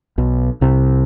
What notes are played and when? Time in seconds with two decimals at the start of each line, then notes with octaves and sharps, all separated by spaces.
0.18 B1 B2
0.61 C2 C3